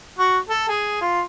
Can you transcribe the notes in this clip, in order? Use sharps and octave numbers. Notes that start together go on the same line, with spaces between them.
F#4
A4
G#4
F4